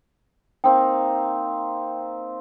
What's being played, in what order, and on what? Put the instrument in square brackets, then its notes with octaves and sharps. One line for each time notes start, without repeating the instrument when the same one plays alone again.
[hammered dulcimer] A#3 C4 D#4 [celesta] G5